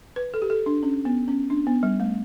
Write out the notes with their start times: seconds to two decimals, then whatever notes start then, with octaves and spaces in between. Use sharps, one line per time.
0.16 B4
0.34 A4
0.42 G4
0.50 A4
0.66 D4
0.83 C#4
1.05 B3
1.28 C#4
1.50 D4
1.67 B3
1.83 G3
2.00 A3